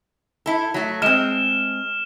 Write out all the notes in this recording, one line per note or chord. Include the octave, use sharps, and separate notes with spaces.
E4 A4
F#3 A3
G#3 C4 F6 E7